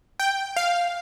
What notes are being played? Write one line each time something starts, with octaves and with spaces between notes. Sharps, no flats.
G5
F5